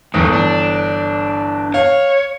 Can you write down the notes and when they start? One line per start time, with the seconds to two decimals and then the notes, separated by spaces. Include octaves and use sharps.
0.14 G1 A2 D#3 E3 D#6
0.33 D4
1.74 C#5 F5